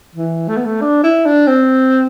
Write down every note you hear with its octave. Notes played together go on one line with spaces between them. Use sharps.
E3
A3
B3
A3
D4
E4
D4
C4